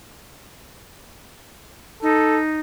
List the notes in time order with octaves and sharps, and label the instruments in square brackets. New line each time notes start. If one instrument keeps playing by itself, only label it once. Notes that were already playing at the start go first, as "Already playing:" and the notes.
[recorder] D#4 [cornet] A4